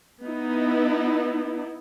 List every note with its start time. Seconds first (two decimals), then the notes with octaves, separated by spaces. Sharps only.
0.24 B3 D#4 E4